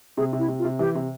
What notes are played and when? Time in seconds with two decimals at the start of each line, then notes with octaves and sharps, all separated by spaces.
0.18 C3 G#4
0.33 C3
0.39 E4
0.48 C3
0.59 F4
0.65 C3
0.79 E3 G4
0.95 C3